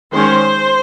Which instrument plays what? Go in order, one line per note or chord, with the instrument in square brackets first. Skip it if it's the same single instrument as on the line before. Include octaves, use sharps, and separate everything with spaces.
[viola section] D#3 G#3 C#4 C5